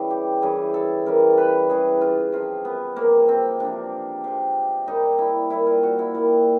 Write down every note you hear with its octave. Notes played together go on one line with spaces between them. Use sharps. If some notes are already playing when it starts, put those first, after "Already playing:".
Already playing: C#3 E3 G3
G4
C#3 E3 G3 G#4
A4
C#3 E3 G3 A#4
B4
C#3 E3 G3 G#4
F4
C3 F3 F4
B3
C3 F3 A#3
C4
C3 F3 D4
C3 F3
A#2 G3 D#4
E4
A#2 G3 E4
F4
F#4
E4
A#2 G3